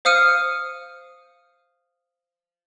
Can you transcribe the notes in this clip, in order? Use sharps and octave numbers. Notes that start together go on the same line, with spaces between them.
C5 F5 D#6 F6 C#7 D#7